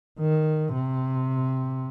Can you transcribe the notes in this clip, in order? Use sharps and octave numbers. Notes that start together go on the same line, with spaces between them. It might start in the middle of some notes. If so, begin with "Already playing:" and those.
D#3
C3